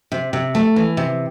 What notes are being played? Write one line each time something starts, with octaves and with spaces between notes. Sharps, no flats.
C3
C3
A3
E3
C3